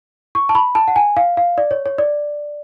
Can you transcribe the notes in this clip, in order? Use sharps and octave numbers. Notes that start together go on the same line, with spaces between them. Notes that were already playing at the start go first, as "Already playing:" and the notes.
C#6
A5
B5
A5
F#5
G#5
F5
F5
D5
C#5
C#5
D5